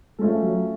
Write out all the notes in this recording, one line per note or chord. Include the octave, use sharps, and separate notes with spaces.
F3 G#3 A3 C#4 F4 A4
F#3